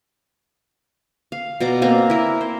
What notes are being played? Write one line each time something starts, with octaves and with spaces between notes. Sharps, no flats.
F5
B2 D5 A#5 D6
A#3 C4 A#5
E4 A#4
C5